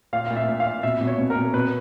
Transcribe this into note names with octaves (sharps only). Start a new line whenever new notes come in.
A#2 F5
A#2 F5
E5
A#2
F5
A#2
B2 E5
B2
C#5
B2
A#4
B2
B2 B4